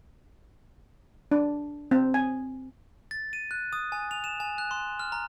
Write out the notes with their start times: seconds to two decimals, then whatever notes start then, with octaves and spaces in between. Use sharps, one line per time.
1.31 D4
1.91 C4
2.14 G#5
3.11 A6
3.33 D#7
3.51 F#6
3.73 D#6
3.92 G#5
4.11 F7
4.24 E7
4.40 G#5
4.58 F#6
4.71 C6
5.00 F6
5.12 A#5